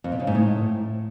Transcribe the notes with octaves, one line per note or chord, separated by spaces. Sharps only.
F2
B2
C#3
G#2
A2